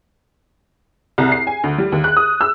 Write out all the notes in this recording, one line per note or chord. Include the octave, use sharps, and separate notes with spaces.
C2
C7
G#5
D2
G3
D#2
F#6
D#6
E6